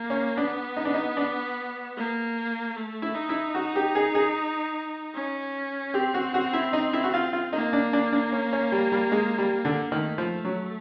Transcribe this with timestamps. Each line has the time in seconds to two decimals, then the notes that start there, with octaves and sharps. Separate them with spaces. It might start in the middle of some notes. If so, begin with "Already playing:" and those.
Already playing: A#3
0.10 C#4
0.37 B3 D4
0.77 D#4
0.85 D4
0.94 D#4
1.17 D4
1.97 A#3
2.76 A3
3.02 E4
3.15 D#4
3.29 E4
3.55 F#4
3.76 G4
3.95 G#4
4.15 G#4
5.14 C#4
5.94 C4 G4
6.14 F#4
6.34 F#4
6.53 E4
6.73 D#4
6.93 E4
7.04 F#4
7.14 F4
7.33 F4
7.53 A#3 D#4
7.73 D4
7.93 D4
8.12 D4
8.32 C#4
8.53 C#4
8.72 G3
8.92 G3
9.12 G#3
9.38 G3
9.65 D3
9.92 D#3 A3
10.18 F3
10.45 F#3